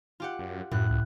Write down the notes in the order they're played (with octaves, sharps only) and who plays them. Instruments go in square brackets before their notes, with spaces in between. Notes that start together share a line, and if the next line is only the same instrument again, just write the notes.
[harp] F4 G4 F#5
[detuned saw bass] F#2
[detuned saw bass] F#2 [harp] A2 F#6
[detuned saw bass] C#2